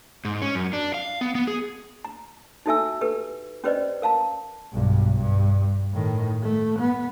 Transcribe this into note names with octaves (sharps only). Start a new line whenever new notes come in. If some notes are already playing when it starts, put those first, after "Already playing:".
G#2
C#4
F#2
D4
F5
B3
B3
G#4
A#5
D#4 F#4 A4 E5 G#5 E6
G4 A4 B4
C#4 G4 B4 C5 D5 D#5
A#4 F5 A5 A#5
B1 G2
G2
A2 D#3
A3
B3